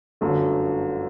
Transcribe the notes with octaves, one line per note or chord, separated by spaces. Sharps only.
G1 F#2 D3 A3